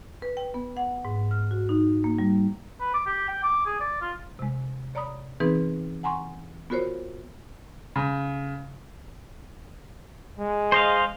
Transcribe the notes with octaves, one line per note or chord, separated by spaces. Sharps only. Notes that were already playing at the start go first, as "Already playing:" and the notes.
B4
G5
B3
F#5
G#2
F6
F#4
D#4
A#3
G3
B4
D6
G4
G5
D6
G#4
D5
F4
C3 G#3
C#5 D5 A#5 B5 D#6
E3 B3 C4 D#4 G#4 B4
F#5 G#5 A#5 C6 C#6
B3 F4 F#4 A#4 C5 C#5
C#3
G#3
C5 D#5 F5